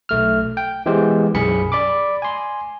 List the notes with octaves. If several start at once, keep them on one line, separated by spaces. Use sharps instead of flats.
B1 A3 F6
G5
E3 G#3 B3 G4 C5
B1 F#2 G#4 G#5 B5 C#7
D5 B5 D6
G#5 C6